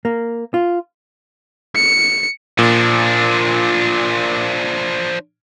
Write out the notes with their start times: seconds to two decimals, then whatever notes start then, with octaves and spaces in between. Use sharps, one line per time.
0.05 A#3
0.54 F4
1.75 C#7
2.59 A#2 F3 D4